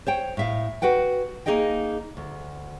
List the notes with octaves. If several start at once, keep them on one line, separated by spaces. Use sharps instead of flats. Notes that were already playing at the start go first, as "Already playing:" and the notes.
C5 C#5 G5
A2 E5 F5
F#4 B4 F#5 G5
A#3 C4 D#4 G#4 D#5 G5
D2